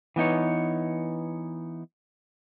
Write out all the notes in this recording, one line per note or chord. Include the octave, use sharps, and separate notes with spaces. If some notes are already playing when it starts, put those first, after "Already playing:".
E3 B3 D#4 C#5